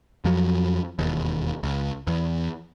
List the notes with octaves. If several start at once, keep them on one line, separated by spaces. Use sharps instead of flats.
F2 F3 F#3
E1 D#2
C#2
E2